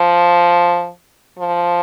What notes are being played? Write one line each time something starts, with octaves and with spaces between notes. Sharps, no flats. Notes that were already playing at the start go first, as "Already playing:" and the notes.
Already playing: F3
F3